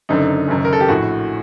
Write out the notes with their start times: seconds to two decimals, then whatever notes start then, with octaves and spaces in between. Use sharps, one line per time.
0.09 F#1 F#2 D3 D#4
0.48 F#1 F#2 D#3
0.65 A#4
0.73 A4
0.80 G4
0.88 A#1 A2 F#4